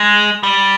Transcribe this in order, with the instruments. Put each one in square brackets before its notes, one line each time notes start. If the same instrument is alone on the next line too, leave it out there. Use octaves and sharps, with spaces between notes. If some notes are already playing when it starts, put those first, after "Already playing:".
Already playing: [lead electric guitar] G#3
G3